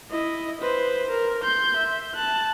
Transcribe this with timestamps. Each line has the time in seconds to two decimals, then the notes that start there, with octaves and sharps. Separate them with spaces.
0.11 E4 D#5
0.62 B4 C5
1.11 A#4
1.43 C6 G6
1.77 E5
2.15 A5 F#6